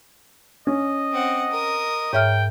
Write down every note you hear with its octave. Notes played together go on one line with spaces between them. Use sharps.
C#4 D#5
C4 F#5
A#4 D#6
G#2 C#5 E5 G5 F6